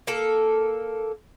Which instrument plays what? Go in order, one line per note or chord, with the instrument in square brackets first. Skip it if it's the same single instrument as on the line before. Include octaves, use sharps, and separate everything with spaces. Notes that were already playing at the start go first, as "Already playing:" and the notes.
[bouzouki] A#3 A4